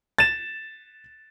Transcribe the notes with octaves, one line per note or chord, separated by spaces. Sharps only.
A6 E7